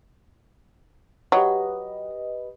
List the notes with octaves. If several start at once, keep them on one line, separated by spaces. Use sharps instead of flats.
F#3 G4 B4 D#5